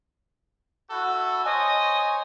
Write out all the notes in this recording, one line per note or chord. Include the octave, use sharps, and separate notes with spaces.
E4 F#4 A4
C5 C#5 D#5 G#5